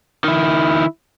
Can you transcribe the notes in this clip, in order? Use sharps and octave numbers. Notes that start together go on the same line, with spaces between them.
D#3 E4